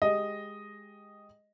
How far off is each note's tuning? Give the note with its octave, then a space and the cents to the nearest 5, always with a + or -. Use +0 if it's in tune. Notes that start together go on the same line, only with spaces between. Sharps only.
G#3 +0 G4 +0 D#5 +0